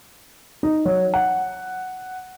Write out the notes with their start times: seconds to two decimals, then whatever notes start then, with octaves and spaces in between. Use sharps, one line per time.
0.63 D#4
0.85 F#3
1.14 F#5